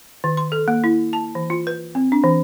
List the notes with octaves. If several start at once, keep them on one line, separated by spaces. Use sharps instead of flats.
D#3
C6
A4
A#3
E4
A5
E3
F4
B4
C4
D4
E3